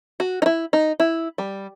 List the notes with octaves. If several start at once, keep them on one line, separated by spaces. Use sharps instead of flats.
F#4
D#4
E4
D#4
E4
G3